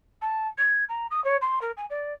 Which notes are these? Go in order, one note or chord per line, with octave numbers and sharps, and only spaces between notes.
A5
G#6
A#5
D#6
C#5
C6
A#4
G#5
D5